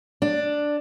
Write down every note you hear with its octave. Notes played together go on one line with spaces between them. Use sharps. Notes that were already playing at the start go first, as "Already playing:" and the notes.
D4